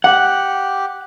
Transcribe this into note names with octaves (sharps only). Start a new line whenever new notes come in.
G4 F#5